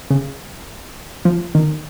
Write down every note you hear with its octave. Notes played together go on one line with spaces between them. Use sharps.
C#3
F3
D#3